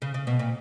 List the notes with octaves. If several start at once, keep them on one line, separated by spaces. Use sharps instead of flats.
C#3
C#3
B2
A#2